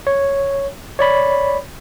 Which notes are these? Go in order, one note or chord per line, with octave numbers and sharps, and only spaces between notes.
C#5
C#5 D5 B5